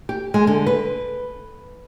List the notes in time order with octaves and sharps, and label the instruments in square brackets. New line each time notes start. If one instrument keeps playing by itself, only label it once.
[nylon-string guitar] G4
G#3
D3
B4